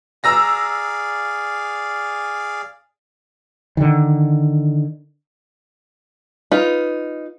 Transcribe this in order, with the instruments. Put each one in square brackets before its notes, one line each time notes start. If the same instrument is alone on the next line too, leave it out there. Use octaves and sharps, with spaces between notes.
[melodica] G#4 D5 F5 [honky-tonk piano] A#5 E6 A#6
[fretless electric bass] D3 D#3
[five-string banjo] D#4 F4 B4